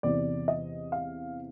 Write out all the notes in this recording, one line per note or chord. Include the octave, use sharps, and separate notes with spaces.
E2 C3 E3 D5
D#5
F5